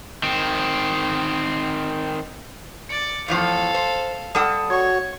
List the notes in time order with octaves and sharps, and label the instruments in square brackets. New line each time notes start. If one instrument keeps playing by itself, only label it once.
[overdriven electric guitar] D#3 C4
[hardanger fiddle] D5 [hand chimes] C#7
[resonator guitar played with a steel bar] E2 A2 F3 [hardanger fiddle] A4 F5
[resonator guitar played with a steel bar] C5
[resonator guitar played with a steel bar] G3 A4 F#5 [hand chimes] A5 D#6
[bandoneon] F#4 C#5 [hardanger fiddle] C#6 [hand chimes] G#6